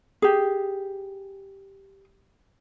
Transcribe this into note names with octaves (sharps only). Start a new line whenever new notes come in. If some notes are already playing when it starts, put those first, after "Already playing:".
G4 G#4